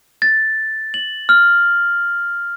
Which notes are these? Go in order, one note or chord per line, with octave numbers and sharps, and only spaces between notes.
A6
F#7
F6